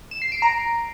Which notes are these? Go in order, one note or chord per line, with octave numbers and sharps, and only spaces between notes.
E7
C7
D7
A#5